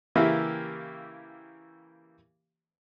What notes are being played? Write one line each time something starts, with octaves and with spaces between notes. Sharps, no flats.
C#3 E3 A#3 E4 G4